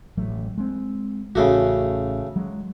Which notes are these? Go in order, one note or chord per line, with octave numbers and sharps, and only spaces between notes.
A1 F#3 A3
G#3 C4
A1 C#3 A3 F#4
F#3 G#3